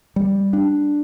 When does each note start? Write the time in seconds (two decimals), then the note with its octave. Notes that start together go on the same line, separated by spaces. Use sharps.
0.16 G3
0.53 D4